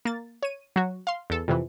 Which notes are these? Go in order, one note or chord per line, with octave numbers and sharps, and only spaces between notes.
A#3 A6
C#5 D#7
F#3 F#4
F5 C6
E2 A4
F2 C3 E3